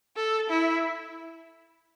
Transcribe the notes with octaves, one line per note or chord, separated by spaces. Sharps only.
A4
E4